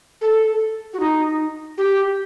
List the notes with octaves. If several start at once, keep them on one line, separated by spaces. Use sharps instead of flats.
A4
F#4
D#4
G4